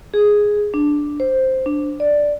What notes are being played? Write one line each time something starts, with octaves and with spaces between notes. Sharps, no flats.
G#4
D4
C5
D4
D5